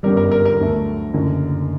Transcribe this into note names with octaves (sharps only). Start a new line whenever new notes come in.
G1 F#2 D3 G3 A#4
A#4
A#4
A#4
D2 D3 F#3 A3
F#1 F#2 D3